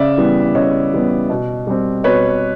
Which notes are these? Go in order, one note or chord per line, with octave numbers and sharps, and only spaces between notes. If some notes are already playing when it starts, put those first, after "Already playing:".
Already playing: C#3 D5 E5
E3 G3 B3
C#3 C#5 D#5
E3 G3 B3
B2
G3 C4
B2 B4 C#5